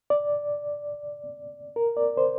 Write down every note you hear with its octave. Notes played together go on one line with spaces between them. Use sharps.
D5
A#4
D5
C5